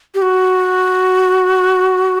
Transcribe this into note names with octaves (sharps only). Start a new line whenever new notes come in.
G4
F#4